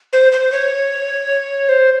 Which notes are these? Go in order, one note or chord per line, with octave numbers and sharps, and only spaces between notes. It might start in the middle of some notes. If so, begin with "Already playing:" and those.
C5
C5
C#5
C5